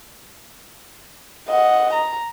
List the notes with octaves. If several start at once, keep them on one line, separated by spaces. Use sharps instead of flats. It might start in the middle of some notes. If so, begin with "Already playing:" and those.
D#5 F#5
A#5